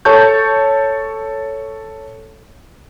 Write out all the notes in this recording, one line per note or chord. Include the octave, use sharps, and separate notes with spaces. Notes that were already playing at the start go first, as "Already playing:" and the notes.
A4 C#5 A5 C#6 G6